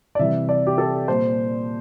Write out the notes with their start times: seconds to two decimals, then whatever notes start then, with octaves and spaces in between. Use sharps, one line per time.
0.15 D5
0.19 C3 E3 G3 E5
0.49 D5
0.67 G4
0.78 A4
1.08 A#2 G3 C5